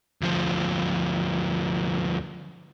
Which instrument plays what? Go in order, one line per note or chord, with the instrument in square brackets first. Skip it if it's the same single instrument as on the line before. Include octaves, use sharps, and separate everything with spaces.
[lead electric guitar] D2 F3